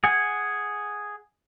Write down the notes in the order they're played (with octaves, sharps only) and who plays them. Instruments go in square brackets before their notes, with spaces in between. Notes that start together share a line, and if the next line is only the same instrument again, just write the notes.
[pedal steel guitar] G#4 F#5 G#5